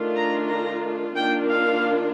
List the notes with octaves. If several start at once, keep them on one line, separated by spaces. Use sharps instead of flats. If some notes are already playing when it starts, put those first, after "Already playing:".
Already playing: D#3 A3 D4 F4
A#5
A#5
D#3 A#3 D4 F4 G5
F5